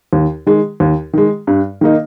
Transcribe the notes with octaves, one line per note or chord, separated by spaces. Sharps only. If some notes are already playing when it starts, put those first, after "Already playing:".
D#2
D#3 G#3
D#2
D#3 G#3
G2
D#3 A#3 D#4